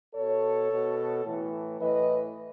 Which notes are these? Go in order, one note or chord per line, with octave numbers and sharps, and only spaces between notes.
B2 A4 C#5
B2
A2 E3
A2 E3 B4 D#5